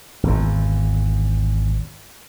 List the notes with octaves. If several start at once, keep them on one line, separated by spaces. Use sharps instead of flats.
G#1 E2